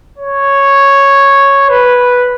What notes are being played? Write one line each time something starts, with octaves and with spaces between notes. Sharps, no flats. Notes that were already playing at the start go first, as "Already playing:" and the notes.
C#5
B4